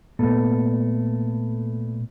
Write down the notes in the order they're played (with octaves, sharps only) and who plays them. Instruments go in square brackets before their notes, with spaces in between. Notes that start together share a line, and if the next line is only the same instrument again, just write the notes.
[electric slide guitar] A#2 A3 B3 A4